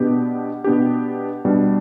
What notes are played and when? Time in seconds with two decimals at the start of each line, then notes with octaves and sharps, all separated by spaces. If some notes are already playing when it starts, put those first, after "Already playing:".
Already playing: B2 B3 D4 G4
0.64 B2 B3 D4 G4
1.45 B2 G3 D4